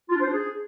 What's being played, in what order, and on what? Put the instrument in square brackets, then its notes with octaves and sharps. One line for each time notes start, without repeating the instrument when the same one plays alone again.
[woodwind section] F4
D4
C5
D4
G#4